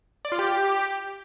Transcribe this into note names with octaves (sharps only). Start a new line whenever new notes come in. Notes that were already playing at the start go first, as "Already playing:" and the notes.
D5
F4
G4